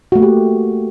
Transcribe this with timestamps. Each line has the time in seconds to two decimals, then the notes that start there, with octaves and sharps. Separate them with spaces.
0.12 F#4
0.15 A3
0.19 A#3
0.22 G4